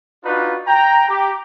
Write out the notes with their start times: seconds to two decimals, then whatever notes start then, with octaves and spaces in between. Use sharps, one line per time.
0.24 D4 D#4 F4 F#4 B4
0.67 G5 A#5
1.09 G4